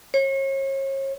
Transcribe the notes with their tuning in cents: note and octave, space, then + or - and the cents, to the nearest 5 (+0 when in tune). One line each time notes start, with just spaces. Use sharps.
C#5 -35